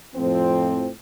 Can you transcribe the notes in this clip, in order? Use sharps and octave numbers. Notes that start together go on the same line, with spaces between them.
F2 A2 F3 C4